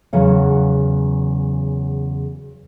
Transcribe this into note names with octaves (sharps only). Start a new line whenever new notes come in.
E2 C#3 F#3 C#5 F#5